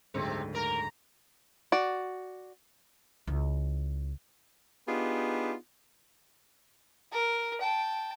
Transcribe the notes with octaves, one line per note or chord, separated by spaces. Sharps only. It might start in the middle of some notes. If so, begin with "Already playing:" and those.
F#1 D2 G#2 C3 C4
A#4 A#5
F#4 D5
C#2 E4
B3 D4 D#4 F4 G4 G#4
A#4
G5 A5